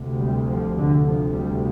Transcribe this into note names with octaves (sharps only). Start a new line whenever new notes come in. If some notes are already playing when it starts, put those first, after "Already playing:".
Already playing: D2 C3
G3
F3
D3
D2 C3 F3
G3